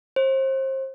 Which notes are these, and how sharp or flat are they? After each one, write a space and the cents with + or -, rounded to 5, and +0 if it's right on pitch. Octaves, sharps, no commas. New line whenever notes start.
C5 +30